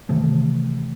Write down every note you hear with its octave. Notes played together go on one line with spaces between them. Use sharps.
C3 D#3 E3 A3